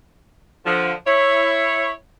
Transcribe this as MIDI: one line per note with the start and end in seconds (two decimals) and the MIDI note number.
0.65 0.92 50
0.65 0.92 53
1.06 1.90 64
1.06 1.90 73